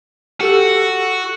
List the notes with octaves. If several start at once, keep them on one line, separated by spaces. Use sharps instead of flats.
F#4 G4 A4 E6